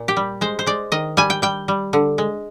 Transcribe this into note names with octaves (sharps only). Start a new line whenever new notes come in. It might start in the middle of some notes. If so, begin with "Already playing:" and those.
Already playing: A#2
G4
G3
G#3 C5
C5
G#3 D5
D#3 D#5
G3 G#5
G5
G3 G5
G3
D3
G#3